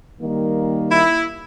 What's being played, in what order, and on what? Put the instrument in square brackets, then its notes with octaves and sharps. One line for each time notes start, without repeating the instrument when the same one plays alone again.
[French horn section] D#3 G3 A#3
[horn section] E4